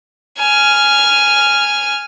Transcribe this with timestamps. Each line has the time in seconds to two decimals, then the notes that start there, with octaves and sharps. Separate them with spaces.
0.38 G#5 F6